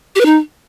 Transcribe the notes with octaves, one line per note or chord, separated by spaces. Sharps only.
G4
B4
D#4